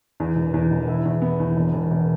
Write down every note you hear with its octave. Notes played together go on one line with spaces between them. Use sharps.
E2
E1
E2
E1
E4
E2
B3
E2
E1
E1
E1